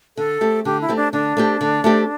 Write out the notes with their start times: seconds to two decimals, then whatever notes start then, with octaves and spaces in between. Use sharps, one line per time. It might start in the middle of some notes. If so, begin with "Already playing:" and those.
0.17 D3 A4
0.41 A3 C4 G4
0.65 D3 G4
0.81 E4
0.89 A3 C4 G4
0.96 D4
1.13 D3 D4
1.37 A3 C4 G4
1.61 D3
1.84 A3 C4 G4